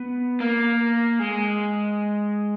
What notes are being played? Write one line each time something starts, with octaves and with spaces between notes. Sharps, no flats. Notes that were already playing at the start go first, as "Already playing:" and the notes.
Already playing: B3
A#3
G#3